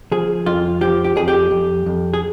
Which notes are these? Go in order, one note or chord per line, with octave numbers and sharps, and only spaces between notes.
F3 G#4
F2 F4
F3 G4
G4
F2 G#4
G4
F2
F2
G#4